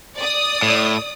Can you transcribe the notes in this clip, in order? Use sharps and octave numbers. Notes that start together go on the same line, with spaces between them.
D5 D#6
A2